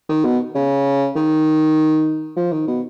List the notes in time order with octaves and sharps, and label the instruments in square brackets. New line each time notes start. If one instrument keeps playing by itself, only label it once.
[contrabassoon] D#3
B2
C#3
D#3
F3
D#3
B2